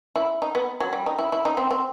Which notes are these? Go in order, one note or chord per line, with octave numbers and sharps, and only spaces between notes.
E4
D#4
B3
F#3
G3
D#4
E4
E4
D#4
C4
C4